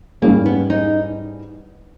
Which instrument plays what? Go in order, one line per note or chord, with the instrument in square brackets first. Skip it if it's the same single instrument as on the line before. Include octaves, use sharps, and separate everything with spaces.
[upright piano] G#2 G3 C#4 G#4 [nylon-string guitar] A#3
[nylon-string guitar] B3
D#4